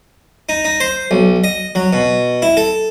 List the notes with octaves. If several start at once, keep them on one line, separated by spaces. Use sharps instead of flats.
D#4
D#4
C5
B1
D#5
F#3
B2
E4
A4